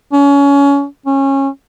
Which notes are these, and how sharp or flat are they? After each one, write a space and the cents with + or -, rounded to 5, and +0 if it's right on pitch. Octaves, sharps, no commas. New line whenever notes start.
C#4 +25
C#4 -20